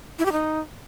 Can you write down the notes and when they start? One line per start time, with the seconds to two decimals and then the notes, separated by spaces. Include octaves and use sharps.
0.19 E4
0.26 G4
0.32 D#4